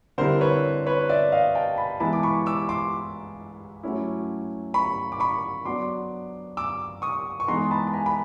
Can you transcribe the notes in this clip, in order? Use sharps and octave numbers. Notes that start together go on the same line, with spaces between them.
D3 G3 C4 E4 A#4 C5
B4 C#5
B4 C#5
D5 E5
D#5 F5
G5 A5
A5 B5
E3 G#3 B3 E4 A5 B5
D6
B5 C#6
D6 E6
C6 D6
F#3 A3 C#4 E4
B5 C#6
D6
B5 C#6
F#3 B3 D4 C6 D6
D6 E6
C#6 D#6
C#6
E3 G#3 B3 D#4 A#5 C6
A5 B5
B5
G#5 A#5
B5